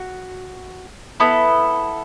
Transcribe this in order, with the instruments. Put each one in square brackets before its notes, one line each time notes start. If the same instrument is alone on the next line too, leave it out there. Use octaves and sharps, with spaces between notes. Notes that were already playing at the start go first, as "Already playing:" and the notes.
Already playing: [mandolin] F#4
B3 E4 A4